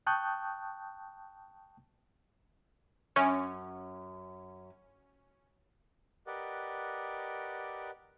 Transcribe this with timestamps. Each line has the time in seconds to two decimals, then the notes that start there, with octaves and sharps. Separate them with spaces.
0.07 G5 A5 C#6 D#6 F#6 G6
3.16 F#2 C#4
6.27 G4 A#4 B4 D5 D#5 F#5